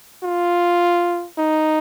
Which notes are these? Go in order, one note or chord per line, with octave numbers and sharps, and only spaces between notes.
F4
D#4